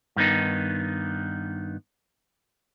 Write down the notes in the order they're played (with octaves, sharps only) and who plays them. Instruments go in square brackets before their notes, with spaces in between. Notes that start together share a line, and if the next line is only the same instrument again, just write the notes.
[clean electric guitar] G2 D#3 B3 D#4